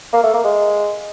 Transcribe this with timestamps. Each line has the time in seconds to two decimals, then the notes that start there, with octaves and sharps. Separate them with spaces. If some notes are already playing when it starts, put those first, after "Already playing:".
0.13 A#3
0.23 A3
0.34 A#3
0.44 G#3